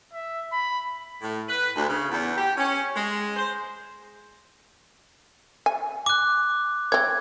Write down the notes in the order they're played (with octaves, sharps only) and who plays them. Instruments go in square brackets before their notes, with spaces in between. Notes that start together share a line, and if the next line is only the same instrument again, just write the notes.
[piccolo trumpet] E5
B5
[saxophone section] A2
B4
D2
C#3
E2
G4
C#4
G#3
C5
[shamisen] G#5
[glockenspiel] D6 F#6
[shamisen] C4 C#5 [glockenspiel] G#6